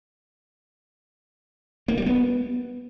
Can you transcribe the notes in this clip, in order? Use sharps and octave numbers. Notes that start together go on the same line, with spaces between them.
A#3
G3
B3